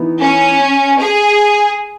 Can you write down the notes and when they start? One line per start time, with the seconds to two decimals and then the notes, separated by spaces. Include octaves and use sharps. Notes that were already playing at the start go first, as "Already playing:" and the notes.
Already playing: E3 B3 D#4
0.21 C#4
0.99 G#4